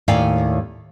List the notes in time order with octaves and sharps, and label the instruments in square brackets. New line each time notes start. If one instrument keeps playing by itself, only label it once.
[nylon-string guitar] D#2 A2 D5 F5 G5 G#5